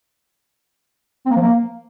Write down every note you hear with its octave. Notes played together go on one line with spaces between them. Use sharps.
C4
A#3
F3
A#3